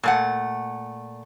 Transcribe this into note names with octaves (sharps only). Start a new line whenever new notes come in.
A#2 A3 F#5